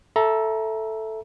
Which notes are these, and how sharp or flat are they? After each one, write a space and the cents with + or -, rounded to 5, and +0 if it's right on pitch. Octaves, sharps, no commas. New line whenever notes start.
A4 +0 E5 +0 A#5 +25